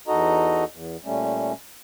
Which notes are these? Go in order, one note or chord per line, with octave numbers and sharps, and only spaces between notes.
E2 D#4 F#4 A4 D#5 A#5
E2
A#2 G3 A3 C#4